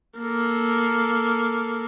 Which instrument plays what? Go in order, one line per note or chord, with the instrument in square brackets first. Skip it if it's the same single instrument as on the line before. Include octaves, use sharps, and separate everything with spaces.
[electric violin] A#3 A4